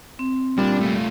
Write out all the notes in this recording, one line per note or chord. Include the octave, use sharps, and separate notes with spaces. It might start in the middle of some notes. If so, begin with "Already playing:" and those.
C4
A#2 G3 D4
A3 F4